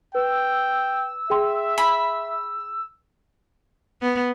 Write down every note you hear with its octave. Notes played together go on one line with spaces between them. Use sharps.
B4 G5 E6
G#4 E5 G5 C6
B5
B3